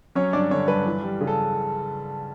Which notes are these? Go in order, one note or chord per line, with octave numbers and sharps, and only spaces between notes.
F#3 C#4 C#5
G2 D4 D5
D3 C#4 C#5
G2 B4
E3
G3
C#3
A4